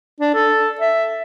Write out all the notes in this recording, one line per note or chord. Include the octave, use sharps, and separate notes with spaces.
D4
A4
E5